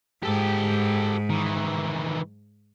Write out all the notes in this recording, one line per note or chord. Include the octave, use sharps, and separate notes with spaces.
G#2 G4 A4
D#3 E3